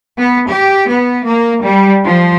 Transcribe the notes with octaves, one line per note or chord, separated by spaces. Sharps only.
B3
G4
B3
A#3
G3
F3